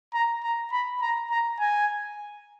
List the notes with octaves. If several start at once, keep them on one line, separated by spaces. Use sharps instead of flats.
A#5
A#5
B5
A#5
A#5
G#5